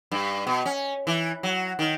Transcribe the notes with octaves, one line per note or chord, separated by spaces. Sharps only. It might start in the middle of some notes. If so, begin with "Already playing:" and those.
G2
B2
C#4
E3
F#3
D#3